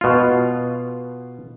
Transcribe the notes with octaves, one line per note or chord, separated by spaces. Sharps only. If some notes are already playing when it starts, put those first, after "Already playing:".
B2 F4